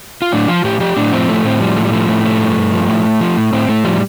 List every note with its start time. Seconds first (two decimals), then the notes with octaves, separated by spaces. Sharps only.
0.22 F4
0.32 A2 D4
0.48 F3 F4
0.64 A2 G4
0.80 F3 G4
0.96 A2 D4
1.12 F3 C4
1.28 A2 A3
1.45 A2 C4
1.60 F3 G3
1.77 A2 A3
1.85 G3
1.92 F3 A3
2.08 A2 A3
2.25 F3 A3
2.41 G2
2.56 G2
2.73 F3
2.88 A2
3.04 A2
3.21 F3
3.37 A2
3.53 A2 C4
3.69 A2 A3
3.84 F3 G3